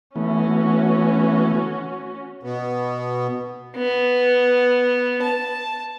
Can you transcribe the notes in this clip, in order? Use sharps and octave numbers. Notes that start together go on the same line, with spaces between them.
E3 A3 B3 C#4 F#4
B2 B3
B3
A5